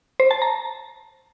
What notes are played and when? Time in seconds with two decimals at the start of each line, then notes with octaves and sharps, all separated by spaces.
0.20 C5
0.31 A5
0.42 A#5